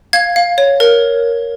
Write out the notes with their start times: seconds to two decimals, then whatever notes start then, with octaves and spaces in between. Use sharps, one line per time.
0.13 F5 G#6
0.36 F5
0.58 C#5
0.80 A#4